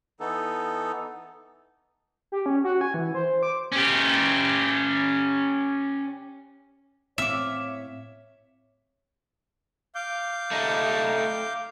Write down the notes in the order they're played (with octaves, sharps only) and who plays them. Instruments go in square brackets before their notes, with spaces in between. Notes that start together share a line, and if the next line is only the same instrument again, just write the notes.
[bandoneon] E3 B3 D#4 A4
[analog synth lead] G4
C#4
F#4
G#5
E3
C5
D6
[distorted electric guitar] C#4 G4
[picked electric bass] A2 C4 [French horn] C#5 [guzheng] E5 [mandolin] F5 D6
[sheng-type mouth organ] F5 D6 G6
[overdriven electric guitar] A3 D#4